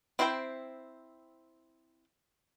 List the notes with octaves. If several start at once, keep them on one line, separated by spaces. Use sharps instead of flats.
C4 E4 C5 D5 G5